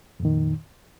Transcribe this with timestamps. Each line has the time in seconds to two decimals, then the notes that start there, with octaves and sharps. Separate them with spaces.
0.20 F2
0.22 A#2
0.25 D#3